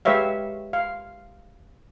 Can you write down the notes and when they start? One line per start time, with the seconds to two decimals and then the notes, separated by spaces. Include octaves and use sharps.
0.05 G#3 G4 B4 C#5 E5 F5
0.73 F5